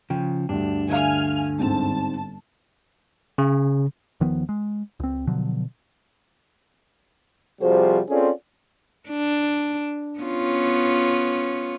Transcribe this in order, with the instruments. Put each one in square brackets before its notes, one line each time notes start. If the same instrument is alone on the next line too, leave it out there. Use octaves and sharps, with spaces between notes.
[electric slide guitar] C#3 F3 [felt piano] G5
[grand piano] D2 G2 [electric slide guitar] D4
[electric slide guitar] D3 [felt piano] D4 E5 F5 [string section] G#5 F6
[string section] G1 A5 [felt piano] G#2 C4
[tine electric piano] C#3
[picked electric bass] D#1 D#3 F3 B3
G#3
C#2 C4
B2 D3 F3 F#3
[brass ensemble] C3 F3 G3 F#4 G#4 C5
C4 C#4 F4 G#4 A4 D5
[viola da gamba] D4
B3 C#4 F4